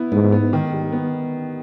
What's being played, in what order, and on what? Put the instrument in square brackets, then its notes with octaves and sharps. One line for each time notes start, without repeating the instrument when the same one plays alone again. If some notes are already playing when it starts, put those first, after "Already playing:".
Already playing: [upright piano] B3 E4
[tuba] G#2 [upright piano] B3
[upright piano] B3
D#3
G3
B3